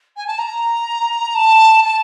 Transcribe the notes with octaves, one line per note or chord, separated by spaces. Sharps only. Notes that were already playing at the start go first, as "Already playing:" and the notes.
G#5
A5
A#5
A5
A5